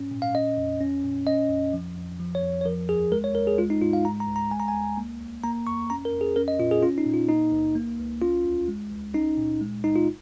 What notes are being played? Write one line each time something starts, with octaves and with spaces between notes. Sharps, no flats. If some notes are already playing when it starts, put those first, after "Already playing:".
Already playing: G#2 C#4
A#2
F5
C#4 D#5
F2
C#4
A#2
C#4 D#5
F2
F3
F2
F3
C#5
F2
C#5
F3 A#4
D#2 G#4
G#3 A#4
C#5
D#2 A#4
G#4
G#3 F4
D#4
G#2 F4
F5
G#3 A#5
A#5
C#2
A#5
G#3 G#5
A#5
G#5
C#2
A#3
D#2
A#3 A#5
F2 C#6
C#4 A#5
A#4
F2
G#4
C#4 A#4
D#5
A#2 F4
G#4
C#4 F4
D#4
A#2
F4
A#3 D#4
C#2
A#3
C#2
C#4 F4
D#2
G#3
C#2
C#4 D#4
A#2
G#3
C#2 D#4
F4